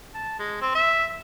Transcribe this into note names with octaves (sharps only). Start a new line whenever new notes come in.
A5
G#3
C4
E5